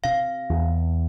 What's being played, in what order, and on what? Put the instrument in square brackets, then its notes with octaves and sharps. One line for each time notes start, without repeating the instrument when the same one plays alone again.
[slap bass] C3 [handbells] F5
[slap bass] E2